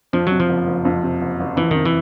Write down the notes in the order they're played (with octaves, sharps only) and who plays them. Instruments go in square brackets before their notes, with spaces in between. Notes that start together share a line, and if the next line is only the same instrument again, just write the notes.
[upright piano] F2 [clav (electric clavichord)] F3
[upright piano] C3 [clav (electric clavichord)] F#3
[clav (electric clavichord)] F3
[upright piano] F#1
F#1
F2
C3
F#1
F#1
[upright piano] F2 [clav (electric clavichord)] E3
[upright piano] C3 [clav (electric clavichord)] D#3
[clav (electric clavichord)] E3